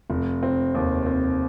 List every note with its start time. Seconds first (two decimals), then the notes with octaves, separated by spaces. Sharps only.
0.10 F1
0.43 C4
0.75 D#2
1.06 C4